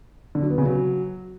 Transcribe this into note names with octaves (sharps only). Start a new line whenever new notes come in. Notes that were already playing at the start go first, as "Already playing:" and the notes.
D3
F#3
B3
C#3
F#3